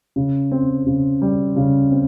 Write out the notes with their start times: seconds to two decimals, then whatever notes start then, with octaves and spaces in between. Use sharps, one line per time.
0.16 C#3
0.52 C4
0.87 C#3
1.22 G3
1.56 C#3
1.92 C4